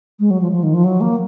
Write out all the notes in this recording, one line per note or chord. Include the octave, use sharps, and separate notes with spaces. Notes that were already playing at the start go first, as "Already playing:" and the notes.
G#3
F#3
F3
F3
D#3
F3
F#3
A#3